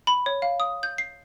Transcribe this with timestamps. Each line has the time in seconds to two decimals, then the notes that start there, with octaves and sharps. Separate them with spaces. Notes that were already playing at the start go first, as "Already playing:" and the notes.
0.07 B5
0.26 C#5
0.42 F5
0.60 D#6
0.83 G6
0.98 C7